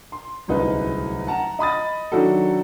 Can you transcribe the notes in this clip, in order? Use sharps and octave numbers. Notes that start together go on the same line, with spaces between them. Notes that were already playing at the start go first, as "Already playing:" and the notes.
C6
D1 C2 C#3 D#4 B4
F#5 A5 A#5
D#5 B5 D#6 A6
D#3 F#3 D4 E4 F#4 A4